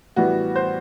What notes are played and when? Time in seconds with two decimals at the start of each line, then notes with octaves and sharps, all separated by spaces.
0.16 A2 E3 G3 B3 F#4
0.56 C5